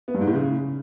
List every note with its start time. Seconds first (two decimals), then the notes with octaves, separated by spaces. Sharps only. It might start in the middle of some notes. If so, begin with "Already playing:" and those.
0.08 B3
0.14 G2
0.21 G#2
0.27 A2
0.34 C#3